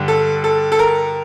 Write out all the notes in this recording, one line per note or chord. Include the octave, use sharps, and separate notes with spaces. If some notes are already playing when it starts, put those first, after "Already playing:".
Already playing: G2 D3
A4
A4
A4
A#4